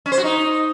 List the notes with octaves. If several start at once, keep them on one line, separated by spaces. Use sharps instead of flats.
C#4
C5
F#4
D#4